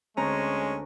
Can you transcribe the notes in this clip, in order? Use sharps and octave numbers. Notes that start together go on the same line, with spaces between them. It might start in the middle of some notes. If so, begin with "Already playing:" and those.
D2 G#3 C4 C#4 A#5